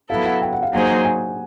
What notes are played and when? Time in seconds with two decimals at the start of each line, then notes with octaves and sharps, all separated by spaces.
0.09 F#3 B3 E4 A4 F5
0.26 F#5
0.42 G5
0.53 F#5
0.63 F5
0.73 F#3 A#3 D#4 G#4 C5 F#5
1.05 G#5